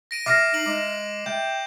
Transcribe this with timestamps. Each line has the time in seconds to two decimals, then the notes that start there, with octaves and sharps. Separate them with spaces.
0.11 A#6 D7 D#7
0.26 E5 D6 F6 A#6 C7
0.53 D#4 C7 D7 F#7
0.66 G#3 D6
1.26 E5 G5 G6